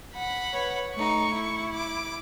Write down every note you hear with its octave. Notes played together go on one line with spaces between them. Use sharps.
F#5 B5
B4 C#5
A3 D#4 C#6
E4
D6